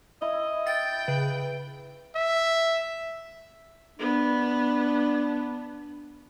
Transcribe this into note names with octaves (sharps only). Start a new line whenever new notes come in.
E4 D#5
G5 A6
C#3 B4
E5
B3 D4